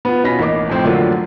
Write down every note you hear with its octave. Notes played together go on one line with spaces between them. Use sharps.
B3 F4
B2 C#4 F4 B5 A#6 B6
A1 A#3 D#4 D6
F2 A2 C4 C5
A2 D3 F#3 A#3 D4 F4